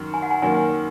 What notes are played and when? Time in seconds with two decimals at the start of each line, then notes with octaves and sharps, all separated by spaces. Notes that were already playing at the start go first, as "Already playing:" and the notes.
Already playing: F#2 D#3
0.14 G#5
0.22 F#5
0.31 G#5
0.42 F#2 D#3 A#3 G#5